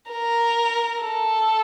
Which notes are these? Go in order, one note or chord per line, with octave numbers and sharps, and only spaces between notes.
A#4
A4